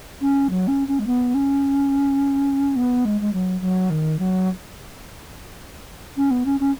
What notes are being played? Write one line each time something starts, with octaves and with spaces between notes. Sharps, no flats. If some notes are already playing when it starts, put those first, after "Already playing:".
C#4
F#3
C#4
C#4
G#3
B3
C#4
B3
G#3
G#3
F#3
F#3
D#3
F#3
C#4
B3
C#4
C#4